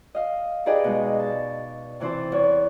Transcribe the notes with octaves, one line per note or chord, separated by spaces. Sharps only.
D#5 F5
D#4 G4 G#4 B4 D5 D#5
B2 G#3
A5
C3 E3 C4 C5 A5
E2 C#5